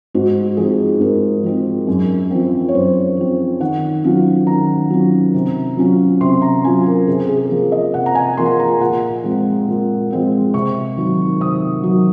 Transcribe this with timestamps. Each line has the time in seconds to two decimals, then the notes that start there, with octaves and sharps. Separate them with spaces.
0.14 G#2 F#4
0.57 F3 C4 D#4 G#4
1.00 G#2 A#4
1.44 F3 C4 D#4
1.87 F#2
2.31 F3 C4
2.68 C#5
2.74 F#2 C5
3.17 F3 C4
3.60 D#3 F#5
4.04 F#3 C#4 F4
4.47 D#3 A#5
4.90 F#3 C#4 F4
5.34 C3
5.77 F#3 C#4 F4
6.21 C3 C6
6.42 A#5
6.65 F#3 C#4 F4 G#5
6.86 A#4
7.07 C3 G#4
7.29 G#4
7.50 F3 A#3
7.72 D#5
7.94 C3 F#5
8.06 A#5
8.15 G#5
8.37 F3 A#3 C6
8.59 A#5
8.81 A#2 F#5
9.24 F3 G#3 C4 F4
9.68 A#2
10.10 F3 G#3 C4 F4
10.54 C3 C#6
10.97 D#3 F#3
11.40 C3 D#6
11.83 D#3 F#3